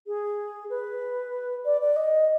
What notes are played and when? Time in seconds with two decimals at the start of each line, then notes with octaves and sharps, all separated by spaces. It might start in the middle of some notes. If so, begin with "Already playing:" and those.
0.07 G#4
0.70 B4
1.65 D5
1.81 D5
1.96 D#5